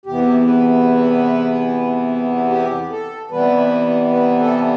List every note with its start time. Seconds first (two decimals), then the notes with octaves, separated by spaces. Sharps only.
0.06 E2 C3 E3 B3 G4
0.46 B4
2.50 G4
2.91 A4
3.31 C3 E3 G3 B3 B4
4.13 B4
4.40 A4